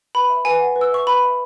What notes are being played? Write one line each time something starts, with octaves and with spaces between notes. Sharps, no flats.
B4 B5
E5
B4 G#5
F#5
B4
E6
E5 C#6
B4 B5
E5